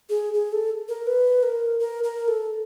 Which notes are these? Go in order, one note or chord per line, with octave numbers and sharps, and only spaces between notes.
G#4
G#4
A4
A#4
B4
A#4
A#4
A#4
A4